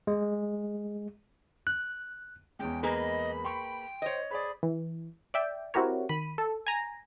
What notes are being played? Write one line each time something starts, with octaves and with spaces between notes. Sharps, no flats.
G#3
F#6
E2 G#3 C#4 G5
A#3 G#4 B4 D#5 B5
G5 C6 C#6
C5 C#5 D#5
G#4 C5 D5 B5
E3
D5 E5 G5
C4 E4 F#4 G4 A#4 C#5
D#3 B5 D#7
A4
G#5 A#5